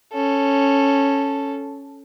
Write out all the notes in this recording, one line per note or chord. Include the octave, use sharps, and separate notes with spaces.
C#4 A4